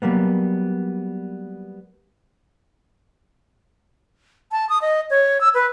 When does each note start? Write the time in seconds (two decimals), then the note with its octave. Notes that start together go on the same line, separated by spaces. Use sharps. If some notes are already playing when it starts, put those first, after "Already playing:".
0.02 F#3 G3 A#3 B3
4.52 A5
4.69 D#6
4.82 D#5
5.10 C#5
5.41 E6
5.54 B4